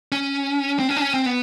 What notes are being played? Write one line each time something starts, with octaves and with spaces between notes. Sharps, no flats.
C#4
C4
C#4
D4
C#4
C4
B3